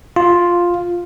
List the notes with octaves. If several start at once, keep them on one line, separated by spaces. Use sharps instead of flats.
F4